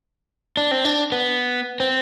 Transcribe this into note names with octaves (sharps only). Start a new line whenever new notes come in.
D4
C4
D4
B3
C4